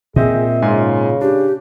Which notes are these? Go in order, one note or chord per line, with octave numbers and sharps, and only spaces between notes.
A#2 C4 G#4 C5 D#5 E5
G#2 C#3 F4 G#5
D4 G4